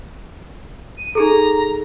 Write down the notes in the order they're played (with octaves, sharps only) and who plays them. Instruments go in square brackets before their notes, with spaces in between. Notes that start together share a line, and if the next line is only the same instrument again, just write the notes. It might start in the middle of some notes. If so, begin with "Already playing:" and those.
[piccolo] D#7
[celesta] D#4 G#4 A4 [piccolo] A#5